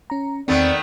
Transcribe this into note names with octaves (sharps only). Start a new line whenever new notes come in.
C#4 A#5
E2 D#3 A3 B3 C4 D5